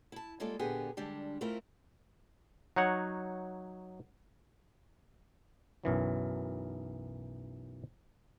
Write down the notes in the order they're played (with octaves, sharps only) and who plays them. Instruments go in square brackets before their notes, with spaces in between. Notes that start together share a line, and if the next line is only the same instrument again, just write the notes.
[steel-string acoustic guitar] E4 A5
G3 G#3 A#3 F4 A4 D5
A#2 D3 B3 G4 G#4
D3 G3 G#3 D4 G4
A3 C4 E4 F4 A#4
[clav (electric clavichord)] F#3 D#4 C#5 F#5
B1 F#2 E3 F#3